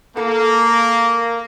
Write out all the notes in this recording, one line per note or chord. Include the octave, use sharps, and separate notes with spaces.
A#3 A4